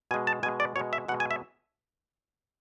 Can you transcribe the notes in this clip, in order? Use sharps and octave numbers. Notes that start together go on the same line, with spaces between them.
B2 G#3 G#5
A5
B2 G#3 G#5
D5
B2 G#3 C#5
E5
B2 G#3 F#5
G#5
E5